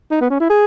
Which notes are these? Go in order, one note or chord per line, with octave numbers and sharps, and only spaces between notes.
D#4
B3
C#4
E4
G#4